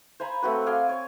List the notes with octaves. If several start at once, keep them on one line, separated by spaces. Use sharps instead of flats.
C5 G#5 A#5 B5
A3 C4 F#4 B4
D5 F5 G#5 C6
C#5